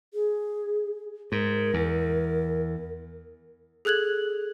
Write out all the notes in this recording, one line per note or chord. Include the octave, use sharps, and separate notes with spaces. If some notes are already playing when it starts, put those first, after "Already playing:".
G#4
G#2 A#4
E2
G#4 A4 F#6 G#6 F#7